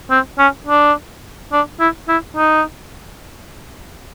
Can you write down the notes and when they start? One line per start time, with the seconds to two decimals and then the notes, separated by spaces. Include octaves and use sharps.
0.10 C4
0.39 C#4
0.67 D4
1.52 D4
1.80 E4
2.08 E4
2.36 D#4